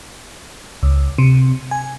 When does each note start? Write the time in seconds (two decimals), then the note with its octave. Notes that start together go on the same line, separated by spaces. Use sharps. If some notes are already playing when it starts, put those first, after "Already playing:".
0.83 C#2
1.18 C3
1.71 G#5